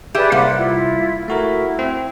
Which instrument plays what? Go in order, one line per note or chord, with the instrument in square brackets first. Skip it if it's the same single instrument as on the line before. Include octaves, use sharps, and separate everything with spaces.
[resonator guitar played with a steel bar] G4 G#4 E5 [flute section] B4 D5
[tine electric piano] C2 [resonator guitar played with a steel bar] A#3 [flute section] C5 F#5
[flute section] E4 F4
[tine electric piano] A3 F#4 A#4 [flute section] E4
[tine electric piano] C4